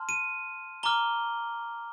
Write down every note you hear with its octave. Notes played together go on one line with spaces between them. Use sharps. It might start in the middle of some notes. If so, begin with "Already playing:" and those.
Already playing: A5 C6 F6
D#7
A#5 D6 F6 G7